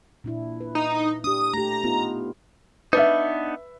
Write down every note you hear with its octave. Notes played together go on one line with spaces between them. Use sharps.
A#2 D4 E4
B4
D#4
D4 G4 D#6
A3 G4 A#5
B3 D#4 F4
B3 D4 D#4 B4 E5